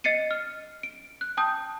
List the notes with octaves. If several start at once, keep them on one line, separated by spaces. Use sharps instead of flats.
D#5 A6 C7 C#7 D#7
F6
D7
F#6
G5 A5 D#6 G6